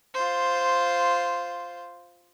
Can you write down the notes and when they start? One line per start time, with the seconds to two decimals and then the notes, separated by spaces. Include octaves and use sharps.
0.14 F4 C5